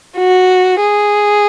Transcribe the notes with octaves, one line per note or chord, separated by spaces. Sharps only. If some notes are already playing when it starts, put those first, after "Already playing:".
F#4
G#4